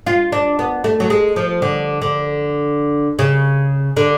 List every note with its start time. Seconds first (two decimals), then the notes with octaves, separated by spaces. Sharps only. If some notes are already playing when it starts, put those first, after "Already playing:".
0.06 F4
0.32 D4
0.59 B3
0.84 A3
1.00 F#3
1.10 G#3
1.36 F3
1.62 D3
2.02 D3
3.19 C#3
3.97 D3